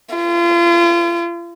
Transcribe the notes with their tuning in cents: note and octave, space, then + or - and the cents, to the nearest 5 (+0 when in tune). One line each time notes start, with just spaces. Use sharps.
F4 -35